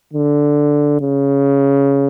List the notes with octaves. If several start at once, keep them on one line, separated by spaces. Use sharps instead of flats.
D3
C#3